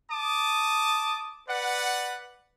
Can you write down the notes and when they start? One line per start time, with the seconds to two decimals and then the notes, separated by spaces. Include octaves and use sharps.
0.11 A5 D6 D#6
1.49 B4 D5 F#5